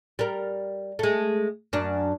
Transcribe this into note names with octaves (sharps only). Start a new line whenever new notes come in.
G3 A#4
G#3 A3
F#2 D4